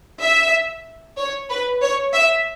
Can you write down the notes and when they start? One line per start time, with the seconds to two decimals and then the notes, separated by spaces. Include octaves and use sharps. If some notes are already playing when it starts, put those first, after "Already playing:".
0.21 E5
1.18 C#5
1.50 B4
1.82 C#5
2.13 E5